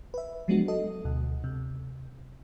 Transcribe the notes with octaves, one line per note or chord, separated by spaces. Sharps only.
B4 E5
F3 F#3 G#3 B3 D4 F#4
A4 D#5
D2 B2
C3